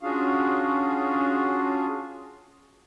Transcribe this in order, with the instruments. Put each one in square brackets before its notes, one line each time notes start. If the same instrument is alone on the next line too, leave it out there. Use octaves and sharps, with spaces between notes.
[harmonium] C#4 D4 F4 F#4 G#4 F5